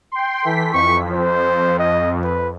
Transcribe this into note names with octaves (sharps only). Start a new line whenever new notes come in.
G5 C6
E3 A4 B6
F2 C#6
C5
D#5
B4